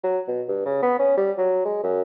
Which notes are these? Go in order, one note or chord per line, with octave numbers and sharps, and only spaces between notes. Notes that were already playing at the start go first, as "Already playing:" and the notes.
F#3
B2
G2
C#3
B3
C#4
G3
F#3
G#3
F#2